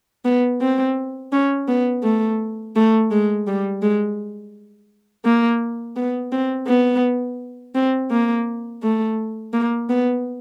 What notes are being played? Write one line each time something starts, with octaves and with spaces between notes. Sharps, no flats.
B3
C4
C#4
B3
A3
A3
G#3
G3
G#3
A#3
B3
C4
B3
C4
A#3
A3
A#3
B3